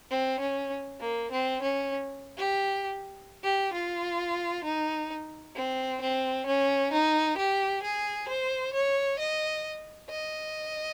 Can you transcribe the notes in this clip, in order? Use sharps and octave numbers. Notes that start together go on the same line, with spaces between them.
C4
C#4
A#3
C4
C#4
G4
G4
F4
D#4
C4
C4
C#4
D#4
G4
G#4
C5
C#5
D#5
D#5